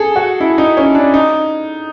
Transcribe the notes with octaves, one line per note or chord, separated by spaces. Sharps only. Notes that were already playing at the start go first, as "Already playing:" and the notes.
Already playing: G#4 A4
F#4
E4
D#4
C#4
D4
D#4